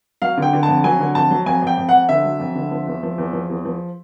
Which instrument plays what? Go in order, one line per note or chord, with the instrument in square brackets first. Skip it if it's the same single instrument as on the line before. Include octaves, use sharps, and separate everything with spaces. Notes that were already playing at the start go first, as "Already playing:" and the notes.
[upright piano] F#3 F5
D3 G5
D3
A5
F2
F#3 G#5
D3
F2 A5
F#3
F2 G#5
F2 G5
F2
F2 F#5
D3 E5
F#3
F2
D3
F3
E2
F3
E2
F3
E2
F3